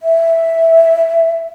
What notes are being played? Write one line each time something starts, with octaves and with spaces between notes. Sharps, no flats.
E5